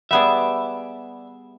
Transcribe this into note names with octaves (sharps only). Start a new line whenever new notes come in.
G3 B3 G#4 D5 E5